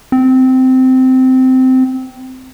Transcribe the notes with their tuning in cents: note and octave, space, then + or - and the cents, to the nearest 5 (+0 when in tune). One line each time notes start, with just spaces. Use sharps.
C4 -15